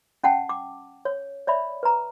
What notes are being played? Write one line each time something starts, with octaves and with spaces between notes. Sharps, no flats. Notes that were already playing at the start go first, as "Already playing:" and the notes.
C#4 F#5 G5 A5
D6
C#5
C#5 D5 E5 B5
B4 A#5